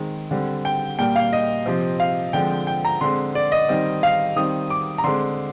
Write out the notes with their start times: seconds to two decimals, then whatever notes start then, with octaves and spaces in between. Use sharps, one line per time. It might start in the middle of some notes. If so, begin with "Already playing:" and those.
Already playing: D#3 G#3 C4
0.31 D3 G3 C4
0.65 G5
0.99 A#2 G3 A#3 G5
1.16 F5
1.33 D#5
1.66 C3 F3 C4
2.00 F5
2.33 D3 F3 G#3 C4 G5
2.67 G5
2.85 A#5
3.01 D3 G#3 C4 C6
3.35 D5
3.52 D#5
3.69 D#3 G3 C4
4.03 F5
4.36 D#3 G3 C4 D#6
4.70 D6
4.98 A#5
5.04 D3 G#3 C4 C6